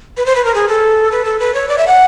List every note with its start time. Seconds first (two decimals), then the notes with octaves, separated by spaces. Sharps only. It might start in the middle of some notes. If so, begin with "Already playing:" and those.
0.17 B4
0.26 C5
0.35 B4
0.45 A#4
0.54 G#4
0.68 A4
1.12 B4
1.25 A4
1.40 B4
1.54 C#5
1.69 D5
1.78 E5
1.87 F#5